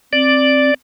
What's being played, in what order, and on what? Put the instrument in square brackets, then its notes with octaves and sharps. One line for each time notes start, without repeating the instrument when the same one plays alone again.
[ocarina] C4 [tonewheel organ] D5